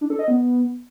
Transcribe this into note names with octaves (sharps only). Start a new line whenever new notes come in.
D4
A4
D#5
B3